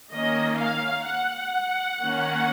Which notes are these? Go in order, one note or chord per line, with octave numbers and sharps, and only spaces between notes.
D#3 A#3 C#4 D#5
F5
F#5
D#3 A#3 C#4